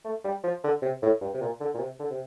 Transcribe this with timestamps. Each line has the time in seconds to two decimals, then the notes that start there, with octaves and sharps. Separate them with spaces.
0.05 A3
0.25 G3
0.44 F3
0.64 D3
0.82 C3
1.02 A2
1.21 G2
1.34 C3
1.41 A#2
1.61 D3
1.74 A#2
1.79 C3
1.99 D3
2.10 C3